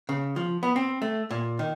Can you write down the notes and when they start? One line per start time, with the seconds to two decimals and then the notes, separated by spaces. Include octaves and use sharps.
0.09 C#3
0.36 F3
0.63 B3
0.76 C4
1.02 A3
1.31 A#2
1.59 D#3